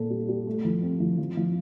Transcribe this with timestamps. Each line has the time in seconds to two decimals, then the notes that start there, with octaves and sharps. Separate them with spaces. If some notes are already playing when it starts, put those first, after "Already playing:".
Already playing: A#2 A4
0.10 G3
0.28 G3
0.47 A3
0.65 F3
0.82 C4
1.00 F3
1.18 F3
1.37 F3